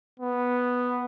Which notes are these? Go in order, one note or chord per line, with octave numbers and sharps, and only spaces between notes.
B3